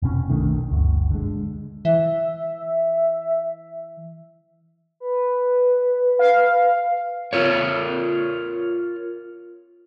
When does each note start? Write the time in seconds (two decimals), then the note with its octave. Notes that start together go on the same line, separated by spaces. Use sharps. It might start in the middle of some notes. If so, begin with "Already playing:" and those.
0.02 F1 B2 C#4
0.30 B1 D#3 A3 D4
0.71 G1 D2
1.11 D3 G#3
1.85 E3 E5
5.00 B4
6.19 F5
7.33 F4 A#4 C#5